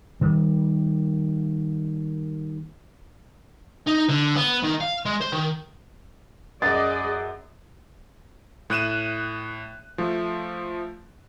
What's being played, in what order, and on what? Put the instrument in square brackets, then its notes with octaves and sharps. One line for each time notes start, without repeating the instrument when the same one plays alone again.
[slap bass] D#3 G3 A#3
[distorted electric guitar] D#4
D3
B3
D#3
F5
G#3
C5
D#3
[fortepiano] F#2 [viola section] G#4 D5 D#5 [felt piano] A6
[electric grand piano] A2 F#6 D#7 E7
F3 A3